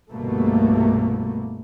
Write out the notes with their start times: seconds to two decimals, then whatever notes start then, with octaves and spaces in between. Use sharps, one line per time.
0.12 G1 C2 B2 A3 A#3